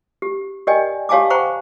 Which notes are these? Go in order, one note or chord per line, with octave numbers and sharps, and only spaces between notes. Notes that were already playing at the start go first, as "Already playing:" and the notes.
G4
G4 A#4 D5 D#5 G5 G#5
G4 C#5 F5 G#5 A5 D6
C5 F#5 G5 A#5 C#6